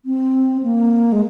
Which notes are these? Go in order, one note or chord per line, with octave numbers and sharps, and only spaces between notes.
C4
A#3
G#3